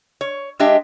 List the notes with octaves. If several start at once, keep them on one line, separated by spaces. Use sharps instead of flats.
C#5
G#3 D4 G4 D#5 E5